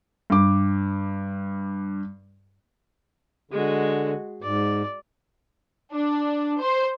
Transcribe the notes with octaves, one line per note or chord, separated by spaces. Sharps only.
G2 D6
D3 G#3 F#4
G#2 D5
D4
C5